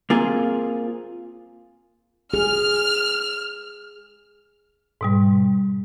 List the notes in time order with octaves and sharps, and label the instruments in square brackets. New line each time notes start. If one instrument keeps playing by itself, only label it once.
[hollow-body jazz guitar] A#3 C4 F4 G#4
[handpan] G#4 [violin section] F6
[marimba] G#2 B2 G3